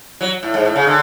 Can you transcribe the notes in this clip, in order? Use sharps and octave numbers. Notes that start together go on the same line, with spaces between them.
F#3
A2
G#2
A2
C#3
D3